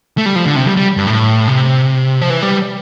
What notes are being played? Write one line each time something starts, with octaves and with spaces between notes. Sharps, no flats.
A3
G3
F3
D3
C3
G3
G3
G2
A2
C3
F3
E3
G3